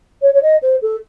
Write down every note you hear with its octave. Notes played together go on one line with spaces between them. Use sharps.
C#5
C#5
D#5
C5
A4